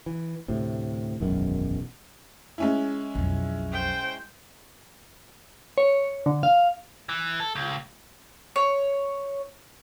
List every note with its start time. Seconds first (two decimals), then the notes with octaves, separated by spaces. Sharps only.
0.06 E3
0.48 D2 A2 C3
1.20 E1 B1 F#2 D#3
2.58 G#3 C#4 E4
3.15 B1 F2
3.73 C5 G5
5.78 C#5
6.26 D3
6.43 F5
7.09 E3
7.40 A4
7.56 C#2
8.56 C#5